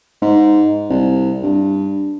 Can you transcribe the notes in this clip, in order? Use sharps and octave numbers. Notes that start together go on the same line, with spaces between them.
G#2
C2
G2